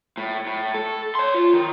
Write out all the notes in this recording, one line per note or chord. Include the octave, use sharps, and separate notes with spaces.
A2
A2
A4
C#5 C6
F4
D#3